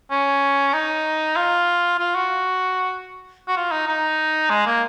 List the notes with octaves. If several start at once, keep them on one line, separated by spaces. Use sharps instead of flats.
C#4
D#4
F4
F4
F#4
F#4
F4
D#4
D#4
G#3
A#3